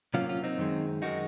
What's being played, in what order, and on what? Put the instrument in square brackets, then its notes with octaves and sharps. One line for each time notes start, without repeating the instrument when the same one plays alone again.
[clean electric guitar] C3 F#3 A#3 C#4 F4
C#4 F4
C4 D#4
F#2 D#3 G#3
F#2 D#3 G#3 D#4 F#4